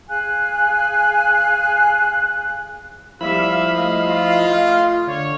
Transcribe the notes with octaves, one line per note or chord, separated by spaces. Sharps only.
G#4 F5 G#5 F#6
F3 G3 E4 E5 F5 B5
A3 D#5 F5
F4
D3 C#5